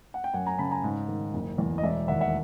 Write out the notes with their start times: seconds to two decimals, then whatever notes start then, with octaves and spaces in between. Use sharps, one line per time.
0.14 F#5
0.24 G5
0.34 F#2 F#5 G#5
0.46 G#5 A#5
0.58 C#3 A5 B5
0.71 G#5 A#5
0.84 G#2
1.08 D#3
1.34 F#1
1.58 E2
1.78 D#5
1.83 E1 D5 E5
2.08 D#2 E5 F#5
2.21 E5 F#5